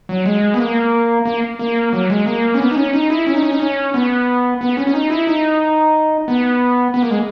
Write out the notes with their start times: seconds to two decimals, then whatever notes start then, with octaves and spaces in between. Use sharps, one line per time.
0.09 F#3
0.26 G#3
0.54 B3
0.59 A#3
1.25 A#3
1.59 A#3
1.93 F#3
2.10 G#3
2.26 A#3
2.54 C#4
2.60 B3
2.71 D#4
2.76 C#4
2.93 D#4
3.10 E4
3.27 C#4
3.35 D#4
3.43 C#4
3.51 D#4
3.60 C#4
3.94 B3
4.61 B3
4.77 C#4
4.87 C#4
4.94 D#4
5.10 E4
5.27 D#4
6.28 B3
6.94 B3
7.02 A#3
7.10 G#3